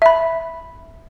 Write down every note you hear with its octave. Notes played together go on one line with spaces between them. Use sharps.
E5 B5